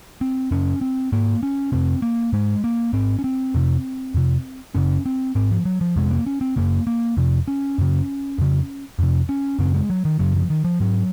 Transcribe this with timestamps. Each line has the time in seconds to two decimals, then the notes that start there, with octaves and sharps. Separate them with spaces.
0.21 C4
0.51 F#2 C#3 C#4
0.81 C4
1.12 G#2 A#3
1.43 C#4
1.72 F2 C3 C4
2.02 A#3
2.33 G#2 G#3
2.64 A#3
2.93 G#2 C4
3.19 C#4
3.24 C4
3.54 F2 C3
4.14 F2 C3
4.75 F#2 C#3 C#4
5.06 C4
5.35 G#2 C4
5.51 F3
5.65 F#3
5.81 F3
5.96 F2 C3 G#3
6.11 A#3
6.26 C#4
6.41 C4
6.56 F#2 C#3 A#3
6.87 A#3
7.17 F2 C3
7.48 C#4
7.78 F#2 C#3
8.38 F2 C#3
8.99 F2 C3
9.29 C#4
9.59 F#2 C#3 C4
9.75 G#3
9.90 F#3
10.05 D#3
10.19 F#2 C#3 F#3
10.35 F3
10.50 D#3
10.65 F3
10.80 G#2 F#3